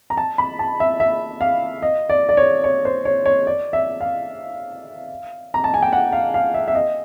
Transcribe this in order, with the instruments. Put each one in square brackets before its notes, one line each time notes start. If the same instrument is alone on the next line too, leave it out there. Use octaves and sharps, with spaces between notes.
[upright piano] A#5
A5
B5
A5
E5
E5
F5
D#5
D5
D5
C#5
C#5
C5
C#5
C#5
D5
E5
F5
A#5
A5
G#5
G5
F#5
F5
F5
E5
E5
D#5